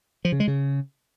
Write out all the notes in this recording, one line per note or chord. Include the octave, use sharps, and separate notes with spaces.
F3
C#3
G#3
C#3